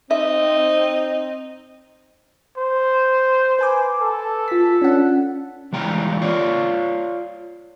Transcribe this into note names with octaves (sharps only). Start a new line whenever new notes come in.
C4 D#4 E5
C5
B4 G#5 D6
A4
F4 B6
C#4 D4 F#5
E3 G3 G#3 F5 G5 A#5
F4 C#5 D5 F5